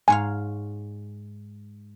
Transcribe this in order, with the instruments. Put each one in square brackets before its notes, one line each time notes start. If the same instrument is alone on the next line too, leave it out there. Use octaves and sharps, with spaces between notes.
[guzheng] G#2 C#5 F5 [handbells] G#5